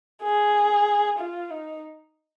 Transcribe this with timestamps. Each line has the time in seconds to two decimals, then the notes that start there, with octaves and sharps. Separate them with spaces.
0.23 G#4
1.19 F4
1.51 D#4